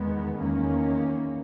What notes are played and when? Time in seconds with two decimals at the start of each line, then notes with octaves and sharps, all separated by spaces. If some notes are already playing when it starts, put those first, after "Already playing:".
Already playing: E2 D#3 G#3 B3
0.37 E2 D#3 A#3 C#4